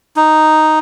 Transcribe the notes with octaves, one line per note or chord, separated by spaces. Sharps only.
D#4